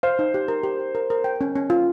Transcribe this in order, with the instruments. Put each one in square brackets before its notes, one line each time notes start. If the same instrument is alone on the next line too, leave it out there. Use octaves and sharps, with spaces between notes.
[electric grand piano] C5 [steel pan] F5
[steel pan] D#4
G4
A#4
G4
G4
A#4
A#4
G5
C#4
C#4
F4